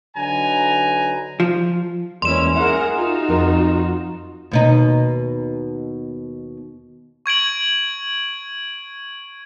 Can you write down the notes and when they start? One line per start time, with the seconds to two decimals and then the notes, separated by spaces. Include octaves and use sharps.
0.17 D3 F#3 D#4 B4 G#5 A#5
1.40 F3
2.22 E2 G#3 A#3 C#4 E4 C6 E7
2.56 E4 G#4 A#4 F#5
2.94 D#4 F4 F#4
3.29 F2 A#4
4.51 D#2 B2 D#4
7.26 C#6 G#6 D7 F#7